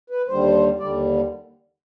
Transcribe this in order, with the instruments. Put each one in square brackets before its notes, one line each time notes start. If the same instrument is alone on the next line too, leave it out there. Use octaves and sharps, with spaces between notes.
[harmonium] B4
D#2 D3 G3 C5
D#2 D3 G3 D5